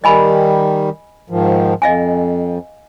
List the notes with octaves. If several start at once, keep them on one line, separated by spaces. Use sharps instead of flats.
D#3 G3 D#5 G#5 B5
G#2 D#3 F3
F2 D#5 F5 G#5